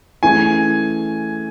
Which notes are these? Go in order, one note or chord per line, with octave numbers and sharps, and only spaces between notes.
E3 A3 C#4 G#4 G#5